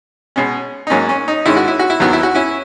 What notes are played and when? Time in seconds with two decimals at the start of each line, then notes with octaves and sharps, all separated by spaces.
0.36 B2 G#3 C#4
0.87 D#4
0.90 G#2 F#3 A#3 C#4
1.09 C#4
1.28 D#4
1.46 G#2 D#3 G#3 C#4 E4
1.57 F#4
1.68 E4
1.79 F#4
1.90 E4
2.00 D#2 D#3 F#3 B3 F#4
2.13 E4
2.23 F#4
2.35 C#4 E4